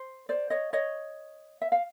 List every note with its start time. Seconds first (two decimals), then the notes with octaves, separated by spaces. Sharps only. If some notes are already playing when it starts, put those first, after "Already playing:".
Already playing: C5
0.29 C5 D5
0.50 C#5 D#5
0.73 C#5 D#5
1.61 E5
1.72 F5